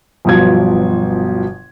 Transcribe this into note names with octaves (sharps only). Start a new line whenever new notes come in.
G1 B2 F3 F#3 G#6